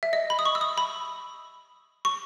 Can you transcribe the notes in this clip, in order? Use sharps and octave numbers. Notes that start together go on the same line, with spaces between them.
E5
D#5
B5
D#6
C#6
E6
D#6
B5
C#6